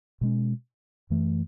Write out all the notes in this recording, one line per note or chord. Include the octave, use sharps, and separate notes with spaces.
B2 G#3 C#4
F#2 E3 A3